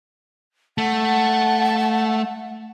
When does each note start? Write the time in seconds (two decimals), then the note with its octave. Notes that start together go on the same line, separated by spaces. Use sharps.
0.78 A3 F#5 A5